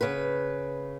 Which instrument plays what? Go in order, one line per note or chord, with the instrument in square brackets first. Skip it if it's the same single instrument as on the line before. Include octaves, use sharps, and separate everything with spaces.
[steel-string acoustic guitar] C#3 B4